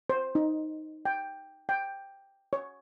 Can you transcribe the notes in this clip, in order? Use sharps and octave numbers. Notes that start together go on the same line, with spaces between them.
C5
D#4
G5
G5
C#5